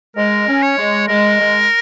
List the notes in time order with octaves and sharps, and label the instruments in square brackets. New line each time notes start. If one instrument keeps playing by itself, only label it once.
[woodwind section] G#3 [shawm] A#4
[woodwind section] C#4
[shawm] C#5
[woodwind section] G#3
[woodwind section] G#3 [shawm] A#4
[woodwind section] G#3